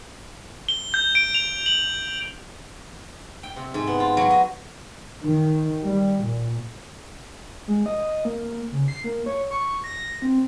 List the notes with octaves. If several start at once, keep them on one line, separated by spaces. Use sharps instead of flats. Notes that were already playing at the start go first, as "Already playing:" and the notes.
G7
G6
D7
F7
F#7
G5
C3
G#2
B3
F4
F#3
D#5
D#3
G3
A#2
G#3
D#5
A#3
C#3
C7
A#3
C#5
C#6
A#6
C4